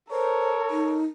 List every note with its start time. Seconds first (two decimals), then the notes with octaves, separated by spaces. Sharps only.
0.11 A4 A#4 C5 C#5
0.70 D#4